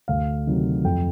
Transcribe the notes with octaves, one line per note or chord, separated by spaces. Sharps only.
D2 F5
C3 D#3 F#3
F2 G5